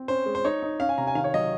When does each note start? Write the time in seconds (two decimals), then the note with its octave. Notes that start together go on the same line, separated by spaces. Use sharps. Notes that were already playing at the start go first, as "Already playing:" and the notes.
Already playing: C4
0.08 C#4 C5
0.26 G#3
0.35 C5
0.45 D#4 C#5
0.63 D#4
0.80 C#4 F5
0.89 G#5
0.98 C3 A#5
1.07 G#5
1.15 D#3 F5
1.24 C#5
1.34 F#3 D#5